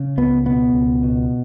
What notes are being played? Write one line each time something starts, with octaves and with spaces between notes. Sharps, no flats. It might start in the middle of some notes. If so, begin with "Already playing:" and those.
Already playing: C#3
C#2 B3
B2 B3
C#2
B2